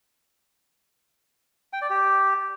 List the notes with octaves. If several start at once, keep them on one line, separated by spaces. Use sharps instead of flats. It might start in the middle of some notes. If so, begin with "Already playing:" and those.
G5
D5
G4